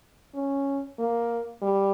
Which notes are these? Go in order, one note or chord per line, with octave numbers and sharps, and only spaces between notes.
C#4
A#3
G3